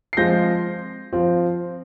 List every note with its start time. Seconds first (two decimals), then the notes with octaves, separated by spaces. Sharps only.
0.13 C7
0.17 F3 G#3 C4 F4 G6 A#6
1.13 F3 C4 F4